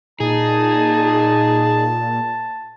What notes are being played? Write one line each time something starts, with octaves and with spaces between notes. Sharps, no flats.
A#2 D#4 G#4 A5